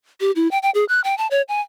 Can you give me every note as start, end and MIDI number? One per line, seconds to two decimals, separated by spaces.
0.21 0.31 67
0.36 0.50 64
0.51 0.58 79
0.63 0.70 79
0.75 0.85 68
0.89 1.01 90
1.04 1.17 79
1.18 1.27 81
1.31 1.42 73
1.48 1.61 80